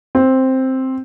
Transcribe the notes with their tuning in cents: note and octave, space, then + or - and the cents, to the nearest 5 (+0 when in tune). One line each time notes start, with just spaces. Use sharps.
C4 +5